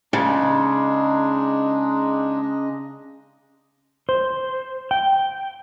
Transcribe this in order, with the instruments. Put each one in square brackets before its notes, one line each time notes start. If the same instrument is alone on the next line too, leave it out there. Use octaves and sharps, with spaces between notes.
[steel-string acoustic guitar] C#3 [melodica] G#3 D4 D#4
[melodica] D#5
[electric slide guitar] C5
G5